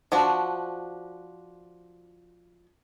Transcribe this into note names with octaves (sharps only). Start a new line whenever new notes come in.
F3 D4 F#4